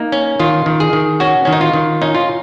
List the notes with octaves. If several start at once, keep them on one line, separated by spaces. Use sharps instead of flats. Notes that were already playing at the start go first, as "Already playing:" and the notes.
Already playing: A#3 D#4
C#4
D#3 F4
D#3
G#4
D#3
C#4 F#4
D#3 C#4
D#4
F4
D#3
C#4 D#4
F4